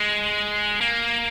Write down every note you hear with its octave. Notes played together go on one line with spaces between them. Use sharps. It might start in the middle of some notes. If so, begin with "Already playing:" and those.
Already playing: G#3
A#3